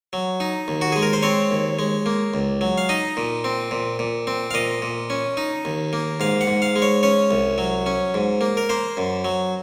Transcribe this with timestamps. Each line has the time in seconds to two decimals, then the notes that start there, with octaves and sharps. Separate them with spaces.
0.13 F#3
0.40 D#4
0.68 D#2
0.81 F#4
0.92 G#3 G#4
1.02 A#4
1.13 C5
1.23 C4 C#5
1.51 D#2
1.79 G#3
2.06 A#3
2.34 C#2
2.61 F#3
2.78 F5
2.89 D#4 D#5
3.17 A#2
3.44 C4
3.71 A#2
3.99 A#2
4.27 C4
4.51 F5
4.54 A#2 D#5
4.82 A#2
5.10 C#4
5.37 D#4
5.65 D#2
5.93 A#3
6.20 G#2 F5
6.41 F#5
6.47 G#2
6.62 F5
6.76 G#3
6.82 C#5
7.03 C#4 C#5
7.31 C2
7.58 F#3
7.86 C#4
8.14 G#2
8.41 A#3
8.57 A#4
8.69 A#3 C5
8.97 F#2
9.25 F#3